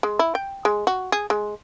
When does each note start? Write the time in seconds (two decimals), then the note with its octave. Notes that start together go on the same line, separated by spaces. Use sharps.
0.03 G#3
0.19 E4
0.35 G5
0.65 G#3
0.87 F#4
1.12 G#4
1.30 G#3